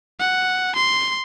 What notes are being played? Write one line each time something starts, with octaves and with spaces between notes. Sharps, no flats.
F#5
C6